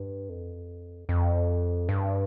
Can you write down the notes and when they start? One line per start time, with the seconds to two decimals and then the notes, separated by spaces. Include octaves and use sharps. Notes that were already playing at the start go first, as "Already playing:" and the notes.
Already playing: G2
0.29 F2
1.09 F2
1.89 G2